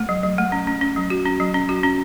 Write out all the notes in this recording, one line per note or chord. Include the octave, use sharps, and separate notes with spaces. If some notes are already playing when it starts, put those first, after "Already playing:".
Already playing: A3
F#3
F#3
A3
C#4
C#4
C#4
F#3
F#4
C#4
F#3
C#4
F#4
C#4